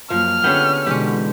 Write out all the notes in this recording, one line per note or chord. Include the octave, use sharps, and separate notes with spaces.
F#2 F3 A#3 F6
D3 B3 C#4 G4 G#4 E5 F#5 G5
B2 D3 E3 G#3 C#4 G4